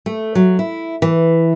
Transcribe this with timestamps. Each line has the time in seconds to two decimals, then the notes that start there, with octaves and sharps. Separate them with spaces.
0.06 A3
0.35 F#3
0.59 E4
1.02 E3